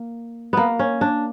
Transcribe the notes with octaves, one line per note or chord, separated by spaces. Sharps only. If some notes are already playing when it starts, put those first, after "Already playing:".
Already playing: A#3
A#3 B3
C#4
D4